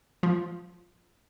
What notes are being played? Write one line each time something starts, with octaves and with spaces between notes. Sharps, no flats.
F3